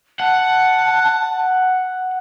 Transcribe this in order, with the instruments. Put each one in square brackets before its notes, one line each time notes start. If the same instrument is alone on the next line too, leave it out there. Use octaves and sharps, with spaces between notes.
[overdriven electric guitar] F#5 [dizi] A5